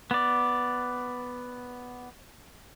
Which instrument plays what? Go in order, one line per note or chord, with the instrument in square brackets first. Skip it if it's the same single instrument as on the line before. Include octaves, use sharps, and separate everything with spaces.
[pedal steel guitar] B3 D5